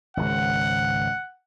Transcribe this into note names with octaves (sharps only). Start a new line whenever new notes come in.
G#1 C#2 F#5